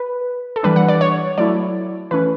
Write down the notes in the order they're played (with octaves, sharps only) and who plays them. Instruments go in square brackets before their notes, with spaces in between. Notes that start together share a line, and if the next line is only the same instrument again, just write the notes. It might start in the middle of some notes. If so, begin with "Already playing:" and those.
Already playing: [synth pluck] B4
A4
E3 G3 D4 B4
F#5
D5
C#5
F#3 A3 E4 D5
E3 A3 C#4 B4